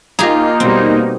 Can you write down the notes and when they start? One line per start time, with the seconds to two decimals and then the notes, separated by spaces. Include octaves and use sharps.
0.19 A#3 D#4 F4 G4 G#4 D#5 A#5
0.60 B2 G3 B3 C4